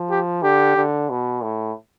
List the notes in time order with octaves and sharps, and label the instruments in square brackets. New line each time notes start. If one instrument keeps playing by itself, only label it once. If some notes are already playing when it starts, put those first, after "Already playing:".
Already playing: [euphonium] F3
[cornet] G4
[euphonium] D3 [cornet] G4
[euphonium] D3
B2
A2